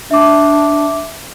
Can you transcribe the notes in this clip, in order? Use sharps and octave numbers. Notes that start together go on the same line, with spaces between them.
D4 E5 D6